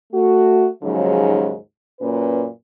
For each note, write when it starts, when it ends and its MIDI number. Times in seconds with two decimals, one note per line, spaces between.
0.13 0.67 57
0.13 0.67 66
0.83 1.54 39
0.83 1.54 44
0.83 1.54 49
0.83 1.54 53
0.83 1.54 54
2.00 2.46 42
2.00 2.46 46
2.00 2.46 61
2.00 2.46 71